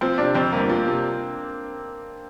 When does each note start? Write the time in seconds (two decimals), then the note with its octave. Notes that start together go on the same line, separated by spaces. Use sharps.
0.01 F3 C4
0.18 C3 D4
0.35 F2 C4
0.52 G1 A#3
0.70 F3
0.85 C3